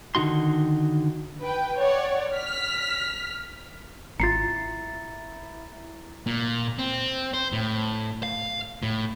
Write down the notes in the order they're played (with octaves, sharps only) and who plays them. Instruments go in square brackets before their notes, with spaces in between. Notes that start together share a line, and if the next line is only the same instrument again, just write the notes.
[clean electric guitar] D3 D#3 D#4 F#4 C6
[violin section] B4 G5
C#5 D5 F#5
F6 B6
[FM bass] G#1 [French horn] E4 [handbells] F4 C7 C#7 [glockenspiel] A#5 A6
[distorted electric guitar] A#2
C4
C5
A2
F5
A2